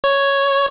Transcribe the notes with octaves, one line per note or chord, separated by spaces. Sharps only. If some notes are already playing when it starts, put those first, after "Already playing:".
C#5